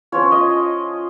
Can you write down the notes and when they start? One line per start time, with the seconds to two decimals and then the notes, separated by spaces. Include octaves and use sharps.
0.12 F3 C#4 F4 C#5
0.32 D#5